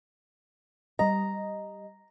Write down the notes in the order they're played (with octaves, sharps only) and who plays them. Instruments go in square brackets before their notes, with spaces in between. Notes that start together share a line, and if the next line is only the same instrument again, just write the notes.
[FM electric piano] G3 D#5 [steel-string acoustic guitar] A#5